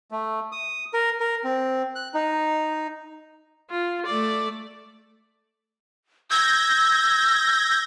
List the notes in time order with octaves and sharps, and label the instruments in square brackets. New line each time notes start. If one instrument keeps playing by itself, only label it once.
[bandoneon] A3
D#6
A#4
A#4
C4
F#6
D#4
[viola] F4
A3 D5
[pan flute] E6 [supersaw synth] G6 G#6 A#6